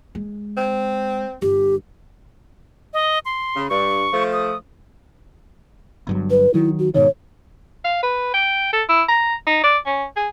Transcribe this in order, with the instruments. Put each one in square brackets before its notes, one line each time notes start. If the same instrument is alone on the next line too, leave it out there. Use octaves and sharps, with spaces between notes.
[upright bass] G#3
[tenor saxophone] C4
[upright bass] G1 [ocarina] G4
[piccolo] D#5
C6
[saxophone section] C#3
[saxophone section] G2 [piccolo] C#6
[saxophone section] F3 A3
[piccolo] D#6
[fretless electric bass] G1 G2 F#3
[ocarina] B4
[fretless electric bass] D#3 F#3 [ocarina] E4
[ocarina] F#4
[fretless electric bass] G#2 B2 D#3 [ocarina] C#5
[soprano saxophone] F5
B4
G5
A4
E4
A#5
D#4
D5
C#4
G#4